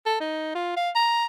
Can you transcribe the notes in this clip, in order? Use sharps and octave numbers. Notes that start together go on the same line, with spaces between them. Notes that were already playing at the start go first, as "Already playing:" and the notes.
A4
D#4
F4
F5
A#5